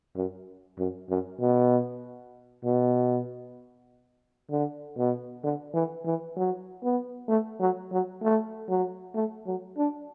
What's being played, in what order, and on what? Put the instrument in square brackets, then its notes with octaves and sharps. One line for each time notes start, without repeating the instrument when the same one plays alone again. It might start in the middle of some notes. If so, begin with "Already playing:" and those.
[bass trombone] F#2
F#2
F#2
B2
B2
D3
B2
D3
E3
E3
F#3
B3
A3
F#3
F#3
A3
F#3
A3
F#3
D4